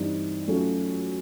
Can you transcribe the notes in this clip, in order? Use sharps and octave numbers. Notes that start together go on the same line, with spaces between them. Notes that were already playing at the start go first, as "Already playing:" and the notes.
Already playing: G2 E3 G3 C4 D#4
F#3 A3 C#4 F4 A4